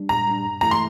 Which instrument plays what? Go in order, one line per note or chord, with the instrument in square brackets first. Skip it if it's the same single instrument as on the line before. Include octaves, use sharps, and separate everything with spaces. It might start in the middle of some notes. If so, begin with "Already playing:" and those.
Already playing: [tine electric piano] G3 D4
[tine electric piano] A#2 [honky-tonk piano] A#5
[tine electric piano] G3 D4
G2
[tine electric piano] E3 A3 E4 [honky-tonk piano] A#5
[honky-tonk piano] C6